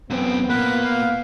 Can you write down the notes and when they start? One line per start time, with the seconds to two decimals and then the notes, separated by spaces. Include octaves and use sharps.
0.10 F#2 B3 C4
0.50 A#2 A#3 B4
0.85 F5